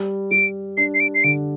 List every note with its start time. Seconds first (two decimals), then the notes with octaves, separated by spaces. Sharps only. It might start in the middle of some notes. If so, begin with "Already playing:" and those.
Already playing: G3
0.31 G3 D7
0.77 D4 C7
0.95 C7
1.00 D7
1.15 C7
1.24 D3 D7